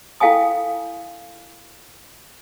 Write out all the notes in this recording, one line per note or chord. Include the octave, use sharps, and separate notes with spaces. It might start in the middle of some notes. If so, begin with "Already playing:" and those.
E4 A4 F5 G5 G#5 D#6